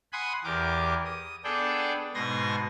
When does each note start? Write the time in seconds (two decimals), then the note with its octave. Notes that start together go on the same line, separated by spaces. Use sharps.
0.13 F#5 G#5 B5 C6 D#6 F#6
0.44 E2 G4 A#4 D6
1.05 D#6
1.44 B3 D4 G#4 A4 D5 G5
2.15 G#2 B2 B3 C6 G#6 A#6